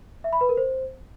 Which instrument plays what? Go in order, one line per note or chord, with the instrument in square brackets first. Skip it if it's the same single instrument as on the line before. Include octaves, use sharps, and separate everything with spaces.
[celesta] E5
B5
B4
A#4
C5